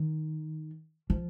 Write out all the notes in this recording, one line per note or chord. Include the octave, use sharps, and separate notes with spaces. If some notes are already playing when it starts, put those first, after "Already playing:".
Already playing: D#3
F3